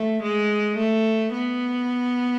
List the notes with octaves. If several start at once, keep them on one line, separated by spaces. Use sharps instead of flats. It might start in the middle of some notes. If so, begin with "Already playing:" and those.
Already playing: A3
G#3
A3
B3